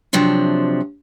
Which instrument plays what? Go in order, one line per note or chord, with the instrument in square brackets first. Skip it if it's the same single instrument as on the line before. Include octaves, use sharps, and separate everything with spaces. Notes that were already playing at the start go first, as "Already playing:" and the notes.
[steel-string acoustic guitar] C3 F3 F#3 D4